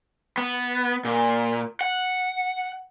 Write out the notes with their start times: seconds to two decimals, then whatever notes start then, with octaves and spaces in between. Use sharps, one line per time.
0.37 B3
1.05 A#2
1.81 F#5